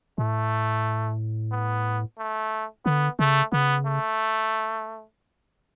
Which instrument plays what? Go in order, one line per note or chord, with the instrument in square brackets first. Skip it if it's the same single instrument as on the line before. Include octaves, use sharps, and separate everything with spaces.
[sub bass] A2 [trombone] A3
[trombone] B3
A3
[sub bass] D3 [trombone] B3
[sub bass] C#3 [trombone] A3
[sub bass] C#3 [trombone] B3
[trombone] A3